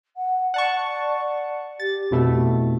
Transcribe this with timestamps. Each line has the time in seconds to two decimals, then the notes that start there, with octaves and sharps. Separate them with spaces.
0.16 F#5
0.54 D5 F#5 A5 C#6
1.80 G4 A6
2.11 F2 B2 A3
2.25 E4